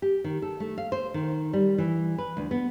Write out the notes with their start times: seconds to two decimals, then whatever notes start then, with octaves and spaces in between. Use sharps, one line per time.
0.02 G4
0.24 D#3
0.42 A4
0.60 A3
0.78 F5
0.92 C5
1.14 D#3
1.53 G3
1.78 E3
2.18 B4
2.37 D2
2.51 B3